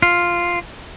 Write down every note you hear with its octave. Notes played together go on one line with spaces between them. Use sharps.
F4